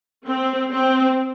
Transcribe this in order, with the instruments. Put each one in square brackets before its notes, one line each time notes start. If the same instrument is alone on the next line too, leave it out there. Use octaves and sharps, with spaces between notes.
[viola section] C4
C4